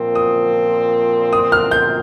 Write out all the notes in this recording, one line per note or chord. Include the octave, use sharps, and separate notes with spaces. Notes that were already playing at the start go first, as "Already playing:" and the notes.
Already playing: A#2 F3 C4
D#6
D#6
F6
G6